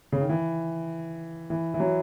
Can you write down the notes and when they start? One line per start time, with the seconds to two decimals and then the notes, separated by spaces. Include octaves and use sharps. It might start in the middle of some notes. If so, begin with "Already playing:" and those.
0.12 C#3
0.21 D#3
0.29 E3
1.50 E3
1.74 E3
1.80 F#3